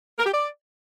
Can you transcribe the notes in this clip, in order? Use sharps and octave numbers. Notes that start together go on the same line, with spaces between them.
A#4
G4
D5